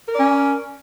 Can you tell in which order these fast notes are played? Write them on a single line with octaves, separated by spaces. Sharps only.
A#4 D5 C#4